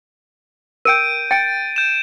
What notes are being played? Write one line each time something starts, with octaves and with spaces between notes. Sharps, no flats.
A#4 G5 G6 D7 D#7
G5 A6 D7
G6 E7